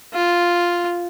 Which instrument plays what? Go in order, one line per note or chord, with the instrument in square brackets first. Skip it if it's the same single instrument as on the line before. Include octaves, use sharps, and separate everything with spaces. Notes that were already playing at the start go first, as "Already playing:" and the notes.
[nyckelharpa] F4